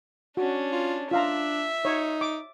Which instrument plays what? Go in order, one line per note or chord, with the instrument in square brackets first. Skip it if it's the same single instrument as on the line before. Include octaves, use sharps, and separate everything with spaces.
[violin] C#4 D4 [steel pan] F#4
[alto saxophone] F4
[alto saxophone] D4 [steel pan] F4 F5 A#5 [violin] E5
[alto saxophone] D#4 [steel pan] C#5
[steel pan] D6